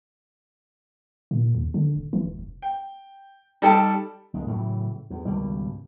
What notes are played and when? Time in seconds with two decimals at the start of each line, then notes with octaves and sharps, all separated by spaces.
1.31 A#2
1.55 D#2
1.74 D3
1.96 D1
2.13 E3
2.25 D#1
2.39 F1
2.62 G5
3.62 G3 D#4 A4 G5 A5
4.34 F#1 C#2 G#3
4.47 A2 C#3 E3 F#3
5.10 E2
5.25 G#1 C#2 B2 G3